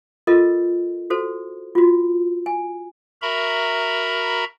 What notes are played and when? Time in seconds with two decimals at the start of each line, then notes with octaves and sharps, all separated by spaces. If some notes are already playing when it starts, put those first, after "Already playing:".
0.27 F4 A4 A#4 D#5
1.10 F#4 A4 C5
1.75 F4 F#4
2.46 G#5
3.22 F#4 A#4 E5 A#5 B5